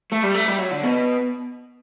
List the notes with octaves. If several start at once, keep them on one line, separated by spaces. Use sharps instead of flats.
A3
G3
A3
G3
F#3
D3
B2